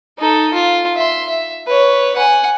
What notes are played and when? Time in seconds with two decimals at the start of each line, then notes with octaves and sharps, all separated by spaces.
0.18 D#4 A4
0.53 F4
0.95 E5 C6
1.29 E5
1.67 B4 C#5
2.16 F#5 G#5